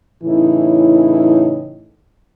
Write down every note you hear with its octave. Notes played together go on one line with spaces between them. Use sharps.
A2 C#3 E3 D#4 E4